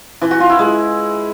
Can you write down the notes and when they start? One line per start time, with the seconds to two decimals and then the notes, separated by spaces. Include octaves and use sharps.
0.21 E3
0.31 F#4
0.40 F4
0.50 E4
0.59 G#3